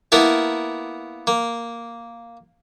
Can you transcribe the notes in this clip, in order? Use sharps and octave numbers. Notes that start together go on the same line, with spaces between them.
A#3 B3 E4 A#4 A5
A#3